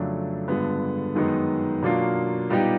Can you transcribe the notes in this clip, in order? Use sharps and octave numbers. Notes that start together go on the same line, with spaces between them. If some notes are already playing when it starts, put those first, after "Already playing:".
Already playing: F2 C#3 F#3 A3 D4
G2 D3 F3 G#3 B3
F#2 D#3 G#3 B3 D#4
B2 F#3 A#3 D4 F4
A#2 G3 B3 D#4 G4